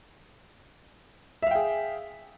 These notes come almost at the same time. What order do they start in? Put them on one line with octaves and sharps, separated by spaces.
E5 F5 G5 G#4